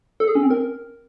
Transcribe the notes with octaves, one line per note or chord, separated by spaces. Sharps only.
A4
G#4
C#4
C4
A#4